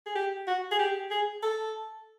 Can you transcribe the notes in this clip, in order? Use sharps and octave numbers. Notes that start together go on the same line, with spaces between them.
G#4
G4
F#4
G#4
G4
G#4
A4